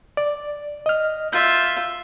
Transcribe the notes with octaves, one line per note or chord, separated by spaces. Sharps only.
D5
D#5 F6
F4 E5 G6